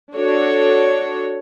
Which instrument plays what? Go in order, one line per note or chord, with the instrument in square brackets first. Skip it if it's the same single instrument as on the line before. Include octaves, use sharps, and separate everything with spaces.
[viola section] D4 F#4 A4 C#5